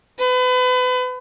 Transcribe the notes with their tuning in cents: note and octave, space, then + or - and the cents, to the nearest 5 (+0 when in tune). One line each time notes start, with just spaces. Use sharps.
B4 +35